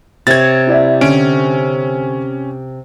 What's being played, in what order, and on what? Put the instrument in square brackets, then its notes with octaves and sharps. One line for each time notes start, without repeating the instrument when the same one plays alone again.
[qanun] C3 C#5 [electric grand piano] G#6 A6
[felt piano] E4 D5 E5
[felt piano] D3 D7 [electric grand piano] C#4